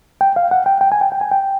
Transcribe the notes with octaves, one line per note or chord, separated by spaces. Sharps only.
G5
F5
F#5
G5
G5
G#5
G5
G5
G#5
G5